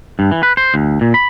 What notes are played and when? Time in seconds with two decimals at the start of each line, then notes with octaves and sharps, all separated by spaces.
0.19 G2
0.31 E3
0.43 B4
0.57 C5
0.74 D2
1.01 A#2
1.14 B5